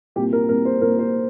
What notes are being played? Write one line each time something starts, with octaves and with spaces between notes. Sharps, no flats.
C2 A#2 A#3 G4
A#4
C2 A#2 A#3 A#4
C5
C2 A#2 A#3 A#4
C5